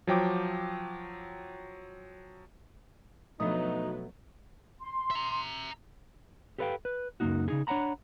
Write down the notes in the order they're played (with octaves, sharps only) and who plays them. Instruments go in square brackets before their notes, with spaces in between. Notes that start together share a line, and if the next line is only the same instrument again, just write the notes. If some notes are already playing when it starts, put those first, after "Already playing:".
[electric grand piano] F3 F#3 G5 D6
[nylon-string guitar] B2 A3 D#5 [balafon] F3 D4 [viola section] F#3 B3 [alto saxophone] D#4
[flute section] C6
[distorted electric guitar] E5 A#5
[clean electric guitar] G4 A4 B4 C#5 F5 G5
B4
C#2 F#2 F#3 A#3 D#4 F#4
C#3 D#4 G#4
D4 C#5 E5 F#5 A#5 B5